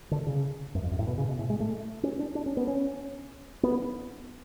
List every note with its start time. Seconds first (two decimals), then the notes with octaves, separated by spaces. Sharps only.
0.11 D3
0.27 C#3
0.75 F#2
0.83 F2
0.91 F#2
0.99 A2
1.07 B2
1.18 C#3
1.29 B2
1.39 A2
1.50 G#3
1.60 A3
2.03 C#4
2.19 D4
2.35 D4
2.46 C#4
2.57 B3
2.67 C#4
3.63 B3